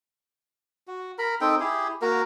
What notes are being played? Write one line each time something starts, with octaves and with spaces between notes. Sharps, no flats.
F#4
A#4 B5
C4 D#4 A4 G5
E4 G4 G#4
A#3 F#4 A#4